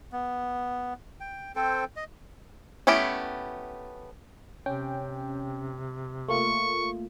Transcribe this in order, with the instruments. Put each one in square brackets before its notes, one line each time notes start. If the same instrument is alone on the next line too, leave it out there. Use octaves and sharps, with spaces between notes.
[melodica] B3
G5
C4 A4 C5 G5
D#5
[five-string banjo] A3 B3 C#4 E4 G4
[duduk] C3 [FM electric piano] C#4 G5
[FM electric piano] A3 A#3 F4 [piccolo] C#6